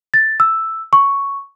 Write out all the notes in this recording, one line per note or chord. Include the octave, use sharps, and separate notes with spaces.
A6
E6
C#6